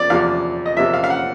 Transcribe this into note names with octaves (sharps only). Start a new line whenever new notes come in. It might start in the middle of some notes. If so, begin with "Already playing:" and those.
Already playing: E2 F3 D5
E2 C3 F3 F5
D#5
E2 C3 F3 E5
F5
F5
F#5